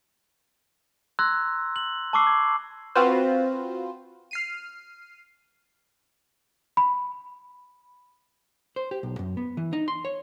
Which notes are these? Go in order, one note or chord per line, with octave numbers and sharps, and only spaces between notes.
A#5 C6 E6 F#6 G#6 A#6
F#7
A5 B5 C#6 D6 E6 C7
G#6
C4 F4 F#4 B4 C5
F6 C7 D#7
B5
C5
G4
B1
F#2
B3
E3
D#4
C6
C#5